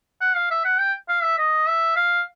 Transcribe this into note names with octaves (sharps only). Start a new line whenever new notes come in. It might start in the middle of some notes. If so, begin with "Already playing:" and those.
F#5
F5
E5
F#5
G5
F5
E5
D#5
E5
F5